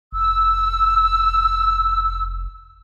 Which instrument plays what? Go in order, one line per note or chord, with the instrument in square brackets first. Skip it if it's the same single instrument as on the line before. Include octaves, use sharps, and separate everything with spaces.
[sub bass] F1 [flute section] E6